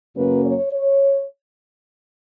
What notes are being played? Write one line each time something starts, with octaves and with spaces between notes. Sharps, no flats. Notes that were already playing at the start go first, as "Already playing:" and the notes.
F#2 C#3 F#3 A#3 C#4 B4
C#5
C#5